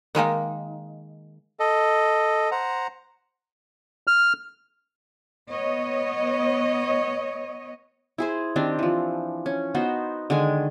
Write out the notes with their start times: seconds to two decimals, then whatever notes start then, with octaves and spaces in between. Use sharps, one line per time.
0.15 D#3 G#3 A#3 D#4
1.60 A4 D#5
2.51 C5 F#5 A#5
4.07 F6
5.50 B3 C#5 D#5
8.18 E4 G#4 C5
8.56 D#3 C4 D4 G4
8.79 E3 F3
9.46 C#4
9.75 B3 D#4 F#4 C5
10.30 D3 D#3 G#3 G#5